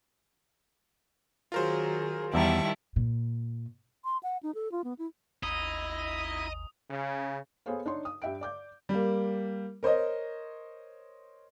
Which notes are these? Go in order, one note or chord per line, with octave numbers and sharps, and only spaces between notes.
D#3 F#3 F4 G#4 A#4 C5
E2 D#3 G3 E4 E5 A5 A#5 C#6
A#2
C6
F#5
D#4
A4
F4
B3
E4
G#1 D#2 D#4 E4 D#5 D#6
C#3
B3 G#4 A4 C5 C#5 F5
D4 D#4 C#5 C6
D#6
G2 E5 G5 D7
D5 D6 G6
G3 A#3
A#4 C5 C#5 D#5